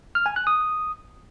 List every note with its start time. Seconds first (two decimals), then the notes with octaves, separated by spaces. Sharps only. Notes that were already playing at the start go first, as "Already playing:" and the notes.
0.15 F6
0.26 G#5
0.36 F#6
0.47 D#6